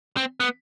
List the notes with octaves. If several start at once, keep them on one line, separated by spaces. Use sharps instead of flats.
C4
B3